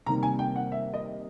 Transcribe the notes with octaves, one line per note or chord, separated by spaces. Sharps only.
C3 D#3 G3 A#3 A#5
G#5
G5
F#5
E5
D#5